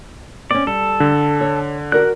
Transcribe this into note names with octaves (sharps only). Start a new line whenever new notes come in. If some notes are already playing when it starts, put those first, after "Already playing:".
C4 C#4 D5
G3 A4
D3
C#5
F#4 A#4 D5 F#6